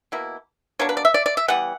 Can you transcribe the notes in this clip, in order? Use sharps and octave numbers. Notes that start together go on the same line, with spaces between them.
B2 A#3 E4
B2 A#3 D4 C#5
B4
D5
E5
D5
D5
E5
E3 G3 B3 F#5